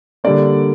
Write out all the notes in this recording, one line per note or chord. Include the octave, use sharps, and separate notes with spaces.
D3 G3 A#3 D5